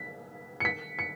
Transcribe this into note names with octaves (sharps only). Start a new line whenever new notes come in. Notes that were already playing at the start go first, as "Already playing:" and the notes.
Already playing: B6
C#7
B6
C#7